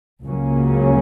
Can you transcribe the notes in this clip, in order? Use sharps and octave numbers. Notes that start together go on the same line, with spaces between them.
C#2 C#3 F#3 A#3 C#4